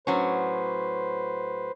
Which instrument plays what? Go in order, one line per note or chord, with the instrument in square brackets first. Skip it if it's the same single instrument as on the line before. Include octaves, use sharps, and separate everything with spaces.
[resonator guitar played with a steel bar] A2 F#3 C#4 [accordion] B4 C5